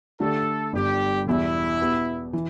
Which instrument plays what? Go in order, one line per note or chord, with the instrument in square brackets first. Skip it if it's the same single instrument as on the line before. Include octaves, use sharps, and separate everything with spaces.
[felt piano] D3 A3 G4 D5 [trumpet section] A4
[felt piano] G1 G2 G3 [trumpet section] G4
[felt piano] E1 E2 B2 G3 [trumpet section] E4
[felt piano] B2 B3 G4
E3